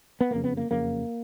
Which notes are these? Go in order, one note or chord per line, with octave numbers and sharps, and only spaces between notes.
B3
F#1 F2 C#3 A#3
B3
A#3
F#1 F2 C#3 A#3